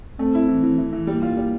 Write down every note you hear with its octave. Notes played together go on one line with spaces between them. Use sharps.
A3 C4
E4
E3
E3
E3
E3
G3 A#3
F4
G3